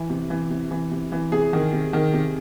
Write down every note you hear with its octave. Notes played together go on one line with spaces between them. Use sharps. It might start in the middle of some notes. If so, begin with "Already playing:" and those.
Already playing: E3
C3
E3
C3
E3
C3
E3
C3 G#4
D#3
C3
D#3
C3